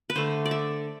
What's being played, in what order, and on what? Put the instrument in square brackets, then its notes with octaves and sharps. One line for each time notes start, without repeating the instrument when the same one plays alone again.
[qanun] B4
D3 A3 C5
D5
E5